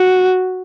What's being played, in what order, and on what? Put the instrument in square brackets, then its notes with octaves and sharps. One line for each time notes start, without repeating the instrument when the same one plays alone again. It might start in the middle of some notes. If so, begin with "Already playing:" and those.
Already playing: [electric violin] F#4